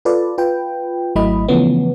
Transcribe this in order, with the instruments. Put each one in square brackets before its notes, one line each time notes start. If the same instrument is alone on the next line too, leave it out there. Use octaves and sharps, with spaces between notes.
[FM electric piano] F4 A4 B4 D5
F4 B4 G5
G#1 F#3 A3 E4 D#5 B5
C#3 E3 F3 A3 B3 C#4